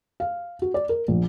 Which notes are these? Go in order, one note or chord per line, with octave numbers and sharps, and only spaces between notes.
F5
F#4
D5
A#4
A#1